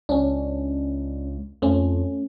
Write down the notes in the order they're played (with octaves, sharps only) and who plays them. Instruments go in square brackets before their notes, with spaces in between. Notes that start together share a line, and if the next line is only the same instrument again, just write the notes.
[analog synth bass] C#2 [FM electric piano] C#4 D4
[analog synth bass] F2 [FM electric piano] A3 C#4